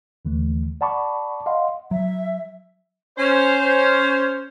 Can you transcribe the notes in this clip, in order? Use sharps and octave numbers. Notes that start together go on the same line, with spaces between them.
D#2 D3 E3 A3
D5 F#5 A5 B5 C#6 D6
D#5 F5 F#5 C6
F#3 E5
C#4 C5